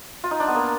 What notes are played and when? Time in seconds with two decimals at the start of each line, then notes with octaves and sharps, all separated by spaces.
0.24 F4
0.31 D#4
0.40 D4
0.48 B3
0.55 A#3